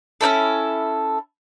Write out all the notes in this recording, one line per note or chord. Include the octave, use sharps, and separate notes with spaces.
C#4 D#4 E4 A4